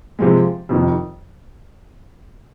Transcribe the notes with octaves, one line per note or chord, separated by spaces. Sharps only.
C3 F3 G#3
F2 C3 D#3